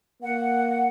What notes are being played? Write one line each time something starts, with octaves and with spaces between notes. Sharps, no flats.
A#3 F#5